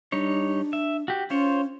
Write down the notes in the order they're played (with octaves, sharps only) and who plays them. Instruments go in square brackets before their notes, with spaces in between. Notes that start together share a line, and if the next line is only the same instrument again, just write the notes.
[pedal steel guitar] G3 D#4 C#5 [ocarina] D4
[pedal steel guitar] E5
F#4 G4
[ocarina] C#4 [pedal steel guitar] F4 C5 C#5